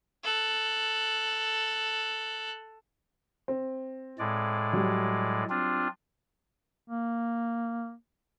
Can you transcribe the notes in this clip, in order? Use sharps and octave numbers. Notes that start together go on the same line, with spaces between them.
A4 F#6
C4
A2 G#3 D5
F#3 G3
C4 D4 F4
A#3